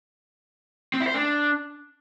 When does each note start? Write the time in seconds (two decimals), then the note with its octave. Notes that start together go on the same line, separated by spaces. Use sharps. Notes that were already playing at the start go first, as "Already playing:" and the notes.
0.94 C4
1.01 E4
1.07 C5
1.14 D4